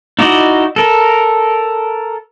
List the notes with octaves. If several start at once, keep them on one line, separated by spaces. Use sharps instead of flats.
D#4 E4 F#4 D5 D#5
A4 A#4